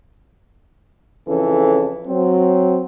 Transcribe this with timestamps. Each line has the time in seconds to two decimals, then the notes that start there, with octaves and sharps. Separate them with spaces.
1.28 F2 C#3 E3 C#4 A4
2.08 F#3 C4